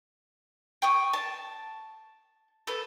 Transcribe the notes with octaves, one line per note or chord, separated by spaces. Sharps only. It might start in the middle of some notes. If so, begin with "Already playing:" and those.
G5 C#6 D#6
A5
A4 B4